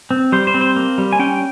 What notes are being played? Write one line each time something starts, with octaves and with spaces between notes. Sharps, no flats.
C4
G3 C5
C5
C4
C5
A#3
G3
G#5
C#4 G5